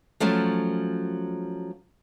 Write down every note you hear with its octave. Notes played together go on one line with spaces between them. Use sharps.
F3 F#3 A3 C#4